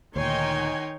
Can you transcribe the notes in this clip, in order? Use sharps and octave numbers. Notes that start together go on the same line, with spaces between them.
D2 A#2 D#3 D#4 C#5 G5 G#5 C6